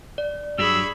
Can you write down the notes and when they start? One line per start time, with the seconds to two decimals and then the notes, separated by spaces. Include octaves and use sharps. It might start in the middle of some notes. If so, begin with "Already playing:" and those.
0.18 D5
0.59 G2 F#3 D4 G#4 B5 C#6 E6